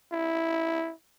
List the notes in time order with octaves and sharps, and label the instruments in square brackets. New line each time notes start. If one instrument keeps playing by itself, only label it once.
[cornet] E4